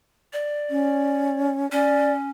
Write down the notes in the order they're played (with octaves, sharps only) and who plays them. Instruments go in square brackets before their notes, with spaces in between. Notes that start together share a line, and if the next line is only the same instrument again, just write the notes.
[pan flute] D5
[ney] C#4
[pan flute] C#4 [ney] D5